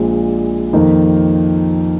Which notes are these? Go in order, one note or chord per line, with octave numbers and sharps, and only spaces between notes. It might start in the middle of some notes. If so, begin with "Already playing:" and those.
Already playing: A#1 A#2 F3 G#3
F2 D#3 A#3 D#4